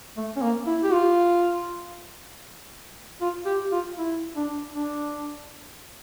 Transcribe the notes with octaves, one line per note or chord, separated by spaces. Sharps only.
A3
C#4
A#3
E4
G4
F4
F4
G4
F4
E4
D4
D4